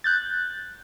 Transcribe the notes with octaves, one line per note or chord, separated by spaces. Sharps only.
F#6 G6 A6